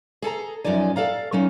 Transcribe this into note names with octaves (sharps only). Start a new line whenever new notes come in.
G#4 A4 G#5 A#5
F#2 F3 D#4 D5 G#5
A4 D5 F5 A#5
F#3 C#4 D#4